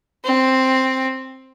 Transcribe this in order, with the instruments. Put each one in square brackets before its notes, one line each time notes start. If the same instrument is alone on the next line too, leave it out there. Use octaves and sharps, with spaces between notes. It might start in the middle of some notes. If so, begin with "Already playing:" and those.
[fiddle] C4